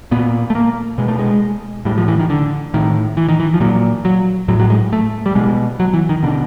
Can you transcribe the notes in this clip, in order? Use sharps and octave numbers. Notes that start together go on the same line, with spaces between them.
A#2 B3
A3
A#3
B2 G#3
A3
G#3
A2 G3
F3
E3
D#3
D3
A2 D#3
E3
D#3
E3
F3
A#2 F#3
F#3
A2 F#3
F#3
G#3
A3
G3
B2 G#3
F#3
E3
D#3
B2 D3